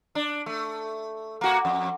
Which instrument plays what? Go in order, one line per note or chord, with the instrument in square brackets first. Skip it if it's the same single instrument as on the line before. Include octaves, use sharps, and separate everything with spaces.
[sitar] D4
A3
A#3 F#4
F2